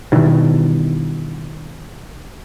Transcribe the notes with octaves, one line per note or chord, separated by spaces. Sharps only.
G2 B2 D#3 E3